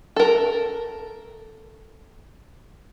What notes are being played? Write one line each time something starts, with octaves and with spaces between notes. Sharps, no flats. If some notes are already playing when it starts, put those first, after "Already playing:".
A4 A#4